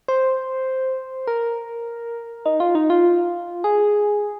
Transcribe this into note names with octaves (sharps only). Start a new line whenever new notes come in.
C5
A#4
D#4
F4
D#4
F4
G#4